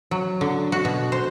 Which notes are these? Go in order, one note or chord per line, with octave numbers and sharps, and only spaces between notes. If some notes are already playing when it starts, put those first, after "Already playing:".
F#3
D3
F#4
B2
C5